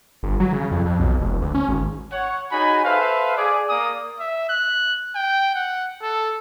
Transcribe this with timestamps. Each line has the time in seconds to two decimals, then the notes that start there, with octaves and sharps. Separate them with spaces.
0.23 G1
0.40 F#3
0.53 C#3
0.71 F2
0.86 F2
0.99 B1
1.21 F1
1.42 D2
1.55 C#4
1.69 G#1
2.12 C#5 F#5
2.51 D#4 F#4 G#4 C#5 G#5 B5
2.85 A4 B4 C5 E5 F5
3.37 G#4 D5
3.70 A#3 D5 D#6
4.19 E5
4.49 F#6
5.15 G5
5.55 F#5
6.02 A4